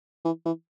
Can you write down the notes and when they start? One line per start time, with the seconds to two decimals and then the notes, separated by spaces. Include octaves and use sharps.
0.25 E3
0.45 E3